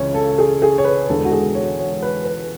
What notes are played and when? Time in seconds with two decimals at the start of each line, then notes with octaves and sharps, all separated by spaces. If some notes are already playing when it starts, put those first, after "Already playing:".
Already playing: C#2 C#3 E3 C#5
0.14 A4
0.38 G#4
0.62 G#4
0.78 C#5
0.84 B4
1.09 E1 E2 D3 G#3 A4
1.25 F#4
1.32 G#4
1.55 C#5
1.79 C#5
2.02 B4
2.25 B4